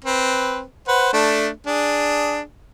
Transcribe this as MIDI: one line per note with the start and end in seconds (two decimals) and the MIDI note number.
0.05 0.62 60
0.05 0.62 71
0.88 1.10 71
0.88 1.10 72
0.88 1.10 78
1.13 1.48 57
1.13 1.48 62
1.67 2.40 62
1.67 2.40 68